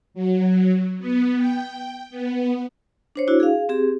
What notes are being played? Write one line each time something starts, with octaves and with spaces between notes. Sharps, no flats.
F#3
B3
G5
B3
D4 C5 C#5
D4 E4 F#4
G#4 F5
C4 G4 G#4